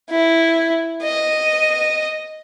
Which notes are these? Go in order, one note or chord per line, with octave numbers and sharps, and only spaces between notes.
E4
D#5